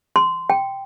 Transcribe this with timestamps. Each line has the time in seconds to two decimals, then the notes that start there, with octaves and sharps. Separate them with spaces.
0.16 C6
0.50 G5